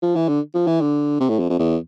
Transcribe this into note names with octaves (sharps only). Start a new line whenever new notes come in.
F3
E3
D3
F3
E3
D3
C3
A2
F2
F2
E2